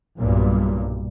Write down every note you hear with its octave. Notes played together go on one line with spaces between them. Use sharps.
B1 G2 A#2